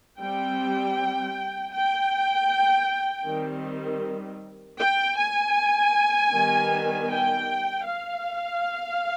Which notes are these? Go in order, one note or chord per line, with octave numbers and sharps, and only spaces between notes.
G3 C4 G5
G5
D#3 G3 C4
G5
G#5
D#3 G3 B3
G5
F5